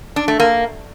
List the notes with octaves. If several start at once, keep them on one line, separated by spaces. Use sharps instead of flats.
D4
A3
A#3